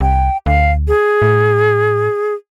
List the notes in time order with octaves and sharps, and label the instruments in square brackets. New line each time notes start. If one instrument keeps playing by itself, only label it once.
[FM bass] C2 [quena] G5
[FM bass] D2 [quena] F5
[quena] G#4
[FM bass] A2